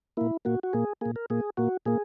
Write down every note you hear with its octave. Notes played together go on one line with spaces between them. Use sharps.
A#2 A#3 E4
A#2 A#3 F#4
F#4
A#2 A#3 G#4
A#2 A#3 G#4
A#4
A#2 A#3 G#4
A#2 A#3 F#4
A#2 A#3 G#4